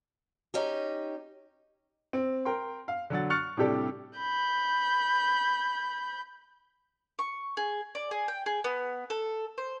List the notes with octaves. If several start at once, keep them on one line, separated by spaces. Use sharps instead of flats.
C#4 D#4 G4
C4
A#4 G5 C6
F5
D3 F#3 F#5 A6
C#6 F6 F#6 A6 C#7
A2 C3 G3 D4 G4 A4
B5 G6
C#6
G#4
D5
G#4
G5
G#4
B3
A4
C5